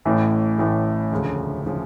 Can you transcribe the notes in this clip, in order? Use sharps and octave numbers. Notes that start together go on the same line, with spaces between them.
A1 A2 E3 A3
A1 A2 E3 A3
E1 D2 C#3 F3
C#3 F3